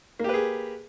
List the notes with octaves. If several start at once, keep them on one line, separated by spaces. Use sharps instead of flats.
A#3 G4 G#4 B4